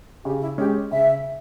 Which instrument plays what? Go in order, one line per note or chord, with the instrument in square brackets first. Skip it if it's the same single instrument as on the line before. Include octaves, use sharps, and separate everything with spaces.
[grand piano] C#3 [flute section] G4
[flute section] E4
[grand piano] G#3 C#4 [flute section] G4
[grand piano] C#3 [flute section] E5